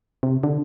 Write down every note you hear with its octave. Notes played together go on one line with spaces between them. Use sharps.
C3
D3